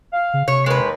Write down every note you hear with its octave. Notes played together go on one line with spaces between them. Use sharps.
F5
C#3
C3 C#5
D#2 G#3 B4